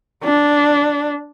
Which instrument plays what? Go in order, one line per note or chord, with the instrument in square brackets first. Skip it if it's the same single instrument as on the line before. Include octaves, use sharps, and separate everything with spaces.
[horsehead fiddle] D4